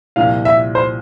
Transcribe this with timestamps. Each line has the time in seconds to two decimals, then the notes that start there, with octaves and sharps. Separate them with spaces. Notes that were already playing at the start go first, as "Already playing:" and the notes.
0.16 C2 A#2 F3 F5
0.45 E5
0.75 C5